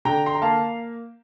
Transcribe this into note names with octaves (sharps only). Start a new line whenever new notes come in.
D3 G5 A#5
C6
A#5
A#3 F5 A5